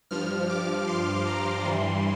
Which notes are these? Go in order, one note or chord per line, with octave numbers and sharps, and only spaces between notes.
G2 F3 F6
D6
C6
A#5
G2 E3 G3 C6